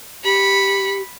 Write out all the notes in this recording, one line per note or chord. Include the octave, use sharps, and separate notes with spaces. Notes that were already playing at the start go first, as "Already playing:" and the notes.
G4 B5 C#7